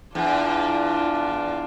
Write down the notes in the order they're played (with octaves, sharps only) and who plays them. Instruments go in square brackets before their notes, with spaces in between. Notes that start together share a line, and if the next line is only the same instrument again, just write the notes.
[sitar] E2 [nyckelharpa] D4 F4